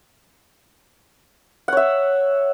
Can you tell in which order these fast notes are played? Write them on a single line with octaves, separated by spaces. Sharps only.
F#5 C#5 E5